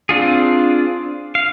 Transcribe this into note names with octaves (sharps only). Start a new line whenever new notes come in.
C4 D4 F4 G#4
F5